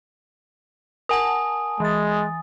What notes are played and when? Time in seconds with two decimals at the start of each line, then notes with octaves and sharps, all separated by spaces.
1.09 A#4 F#5 G#5 A5 D#6
1.80 E3 G#3 A6